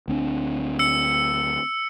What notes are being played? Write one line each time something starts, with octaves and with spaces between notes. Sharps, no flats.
D2 C4 D4
E6 C#7